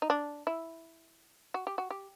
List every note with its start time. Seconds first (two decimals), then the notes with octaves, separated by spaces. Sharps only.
0.02 D#4
0.10 D4
0.47 E4
1.54 F#4
1.67 G4
1.78 F#4
1.90 G4